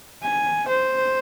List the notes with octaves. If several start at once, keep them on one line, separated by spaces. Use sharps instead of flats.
G#5
C5